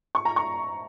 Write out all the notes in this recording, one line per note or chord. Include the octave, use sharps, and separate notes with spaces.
C#6
A#5
C#6